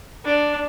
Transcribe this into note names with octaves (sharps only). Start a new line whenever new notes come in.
D4